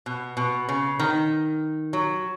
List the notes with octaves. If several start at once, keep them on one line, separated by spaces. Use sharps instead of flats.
B2
B2
C#3
D#3
F#3